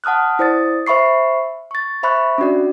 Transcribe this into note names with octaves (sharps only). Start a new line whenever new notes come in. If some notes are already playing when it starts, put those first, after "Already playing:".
F#5 A5 D#6 F6 F#6
E4 C5 D5 D#6 A6
C5 E5 B5 C#6 C7
C#6 A6
C5 E5 B5 C#6 F#6
C#4 D4 F#4 D5